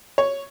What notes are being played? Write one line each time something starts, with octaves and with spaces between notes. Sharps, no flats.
C#5